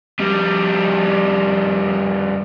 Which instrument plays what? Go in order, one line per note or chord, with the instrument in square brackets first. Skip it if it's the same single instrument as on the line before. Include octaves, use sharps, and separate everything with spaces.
[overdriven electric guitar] F2 G3